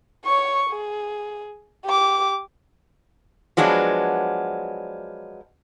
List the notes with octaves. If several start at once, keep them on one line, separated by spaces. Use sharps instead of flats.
C#5 C#6
G#4
G4 D6
F3 F#3 G#3 B3 D4